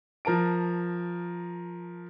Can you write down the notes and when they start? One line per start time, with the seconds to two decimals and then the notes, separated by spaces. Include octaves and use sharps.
0.25 F3 A#4 A5 D7